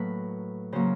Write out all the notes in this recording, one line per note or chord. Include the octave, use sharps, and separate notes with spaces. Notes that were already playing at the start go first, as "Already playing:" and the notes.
Already playing: A2 F#3 A#3 B4
C#3 F#3 A#3 C5